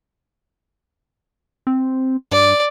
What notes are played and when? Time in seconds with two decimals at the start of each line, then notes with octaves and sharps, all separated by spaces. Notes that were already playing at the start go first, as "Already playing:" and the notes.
1.67 C4
2.32 G2 D5